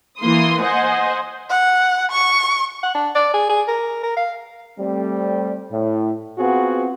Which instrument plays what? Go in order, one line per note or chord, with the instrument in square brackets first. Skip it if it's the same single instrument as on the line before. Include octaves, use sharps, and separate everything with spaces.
[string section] E3 A#3 C6 D#6
C5 D#5 F#5 G#5
[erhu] F#5
C#6
[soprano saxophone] F#5
D4
D5
G#4
G#4
A#4
A#4
F5
[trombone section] G3 A3 C4
A2
B3 C4 F4 F#4 G#4 B4